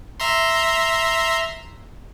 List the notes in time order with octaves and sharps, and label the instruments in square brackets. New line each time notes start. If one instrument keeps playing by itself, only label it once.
[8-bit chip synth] E5 A#5 C6